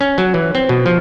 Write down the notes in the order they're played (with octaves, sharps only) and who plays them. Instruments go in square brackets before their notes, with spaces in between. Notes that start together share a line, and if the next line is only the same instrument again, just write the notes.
[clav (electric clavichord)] C#4
F#3
E3
C4
B2
F3